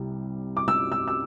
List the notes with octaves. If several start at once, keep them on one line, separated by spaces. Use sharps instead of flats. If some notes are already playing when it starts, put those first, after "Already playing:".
Already playing: C2 C3 G3
D6
E6
E6
E6